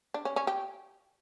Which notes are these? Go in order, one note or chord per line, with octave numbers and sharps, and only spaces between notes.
D4
C#4
C#4
G4